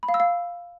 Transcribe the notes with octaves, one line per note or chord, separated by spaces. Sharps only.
B5
F5
E6
F5